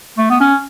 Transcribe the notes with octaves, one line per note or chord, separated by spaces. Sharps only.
A3
B3
C#4